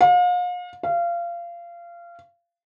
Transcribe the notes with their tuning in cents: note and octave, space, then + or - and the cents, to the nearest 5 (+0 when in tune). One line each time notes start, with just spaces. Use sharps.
F5 +40
F5 -25